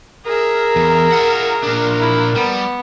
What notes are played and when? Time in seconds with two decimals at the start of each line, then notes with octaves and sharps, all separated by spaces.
0.26 G#4 A#4 E5
0.76 E2
1.12 F4 F#5
1.63 A#2 D4
1.99 E4
2.35 G3 B3